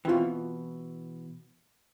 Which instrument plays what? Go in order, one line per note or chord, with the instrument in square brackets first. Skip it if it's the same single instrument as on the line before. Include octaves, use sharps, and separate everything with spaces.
[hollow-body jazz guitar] B2 E3 [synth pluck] C4 F4